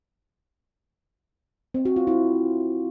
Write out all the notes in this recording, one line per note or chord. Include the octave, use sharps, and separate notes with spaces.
C4
F#4
F4
E4